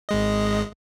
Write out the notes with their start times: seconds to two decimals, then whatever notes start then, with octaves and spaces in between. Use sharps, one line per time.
0.09 G#1 G#3 D#5